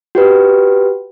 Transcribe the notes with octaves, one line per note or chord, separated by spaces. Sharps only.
F#4 G4 B4